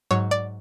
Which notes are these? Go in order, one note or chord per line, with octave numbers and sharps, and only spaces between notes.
G#2 F#3 C#5
D5